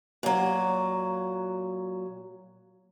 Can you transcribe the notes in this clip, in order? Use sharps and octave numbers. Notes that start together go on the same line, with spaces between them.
A#2 F#3